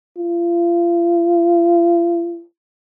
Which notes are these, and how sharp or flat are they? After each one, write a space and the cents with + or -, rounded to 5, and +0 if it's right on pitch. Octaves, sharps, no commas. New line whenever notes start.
F4 -35